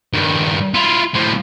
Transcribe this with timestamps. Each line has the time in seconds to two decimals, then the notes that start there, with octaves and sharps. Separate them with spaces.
0.14 G2 D#3
0.74 E4 F4
1.14 A2 C4